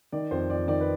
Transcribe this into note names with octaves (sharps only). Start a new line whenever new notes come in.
D#3 D5
F2 C5
F2 D5
D#3 D5
B4